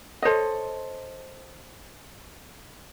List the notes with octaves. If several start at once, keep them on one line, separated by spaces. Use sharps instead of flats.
A4 C5 C#5 D#5